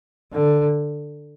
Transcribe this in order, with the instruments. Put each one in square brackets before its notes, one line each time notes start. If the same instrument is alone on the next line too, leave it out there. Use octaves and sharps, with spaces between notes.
[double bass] D3